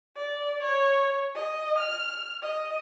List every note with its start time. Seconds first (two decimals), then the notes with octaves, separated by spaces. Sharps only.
0.16 D5
0.63 C#5
1.35 D#5
1.79 F6
2.42 D#5